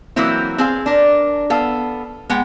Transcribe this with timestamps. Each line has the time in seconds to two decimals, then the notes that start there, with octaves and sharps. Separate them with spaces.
0.16 E3 F#3 A#3 C4 E4
0.58 C4 G#4 F5
0.86 D4 A#4
1.50 B3 A4 F5
2.29 G#3 B3 F#5 G5